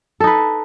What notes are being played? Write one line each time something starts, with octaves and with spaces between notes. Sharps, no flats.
D#4 A4 B4